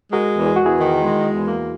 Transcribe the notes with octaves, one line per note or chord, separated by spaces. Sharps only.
G#3 F#4 A#4
E2
G#4
E2 F#4
E4 G#4
D#3
G#3
E2
A#3